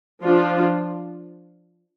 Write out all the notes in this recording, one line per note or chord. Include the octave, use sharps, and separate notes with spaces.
F3 D4 F4